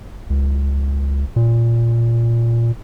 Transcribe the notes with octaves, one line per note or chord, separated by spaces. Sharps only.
C#2
A#2